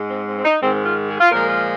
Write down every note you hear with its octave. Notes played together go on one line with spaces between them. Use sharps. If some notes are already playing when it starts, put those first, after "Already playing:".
Already playing: G#2 G#3
C4
C4
C4
D#4
G#2 D#3 G#3 C4
C4
F4
G#4
F4
A#2 F3 G#3 A#4
F4